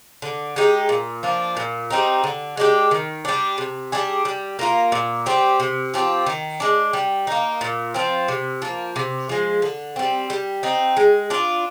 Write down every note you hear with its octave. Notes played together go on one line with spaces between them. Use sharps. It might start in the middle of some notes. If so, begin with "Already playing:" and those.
D3
G#3 D#4 G4
A#2
F3 A#3 D4
A#2
G3 C4 D#4
D3
G#3 D4 G4
D#3
G3 D4
C3
G3 D4 G#4
G3
A#3 F4 A#4
A#2
G3 C4 G4
C3
F3 C4 G4
D#3
G#3 D4
G3
A#3 D#4
A#2
F3 C4
C3
F3 A#3
C3
F3 G#3
D3
G3 C4
G3
C4 D#4
G#3
D4 F4